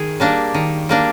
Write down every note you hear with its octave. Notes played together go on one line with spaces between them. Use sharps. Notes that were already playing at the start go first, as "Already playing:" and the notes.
Already playing: D#3 G#4
G3 A#3 D4
D#3
G3 A#3 D4